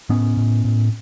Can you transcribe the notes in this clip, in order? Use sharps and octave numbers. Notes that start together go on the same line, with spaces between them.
A2 B3 C#4
A2
A2